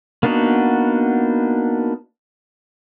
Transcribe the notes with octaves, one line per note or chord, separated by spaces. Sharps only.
A#3 B3 D4 D#4 F#4